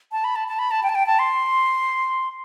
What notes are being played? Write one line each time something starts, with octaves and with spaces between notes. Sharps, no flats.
A5
B5
A5
A5
B5
A5
G5
A5
G5
A5
C6